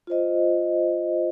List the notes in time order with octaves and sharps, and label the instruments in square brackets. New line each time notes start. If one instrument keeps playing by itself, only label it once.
[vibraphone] F4 C5 D#5